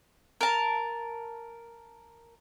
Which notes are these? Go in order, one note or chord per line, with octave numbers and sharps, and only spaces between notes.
A#4 A5